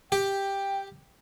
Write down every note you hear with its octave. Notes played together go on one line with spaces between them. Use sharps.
G4 G5